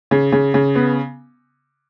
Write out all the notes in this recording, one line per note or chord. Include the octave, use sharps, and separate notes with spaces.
C#3
C#3
C#3
B3